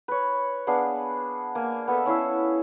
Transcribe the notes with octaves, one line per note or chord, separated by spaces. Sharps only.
B4 C#5
B3 D4 G#4 F5
A#3 G#5
B3 A4 E5
C#4 E4 F5 E6